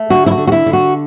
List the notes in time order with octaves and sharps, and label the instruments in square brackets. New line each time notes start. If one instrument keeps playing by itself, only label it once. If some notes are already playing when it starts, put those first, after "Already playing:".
Already playing: [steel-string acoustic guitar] A3
D3 F#4
E4
F#4
D3
F#4
E4
D3
F#4